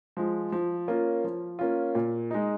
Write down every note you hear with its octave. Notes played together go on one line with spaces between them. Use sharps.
F3 G#3
F3
A#3 C#4 F4
F3
A#3 C#4 F4
A#2
G#3 D#4